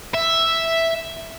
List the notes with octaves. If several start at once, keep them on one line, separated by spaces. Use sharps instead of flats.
E5